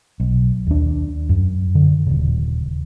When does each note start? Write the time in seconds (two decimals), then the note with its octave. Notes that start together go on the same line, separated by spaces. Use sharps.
0.20 B1
0.67 D#2 D4
1.29 F#2
1.75 D3
2.07 D#1 C#3